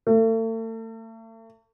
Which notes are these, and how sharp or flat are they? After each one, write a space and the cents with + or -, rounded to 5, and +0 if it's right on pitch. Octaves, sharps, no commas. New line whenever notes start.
A3 +40